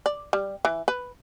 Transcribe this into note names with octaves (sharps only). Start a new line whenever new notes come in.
D5
G3
E3
B4